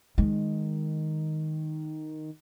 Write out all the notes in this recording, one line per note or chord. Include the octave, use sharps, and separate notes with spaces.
D#3 G#3